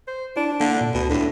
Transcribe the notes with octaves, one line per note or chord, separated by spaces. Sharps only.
C5
D4 E4
D3 A#3
A#2
D2 B2
A2 D3 D4